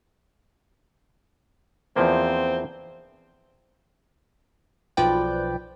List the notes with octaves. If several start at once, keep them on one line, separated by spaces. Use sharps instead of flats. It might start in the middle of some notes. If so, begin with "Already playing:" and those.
E2 F3 A#3 C4
B1 F3 B4 D5 G5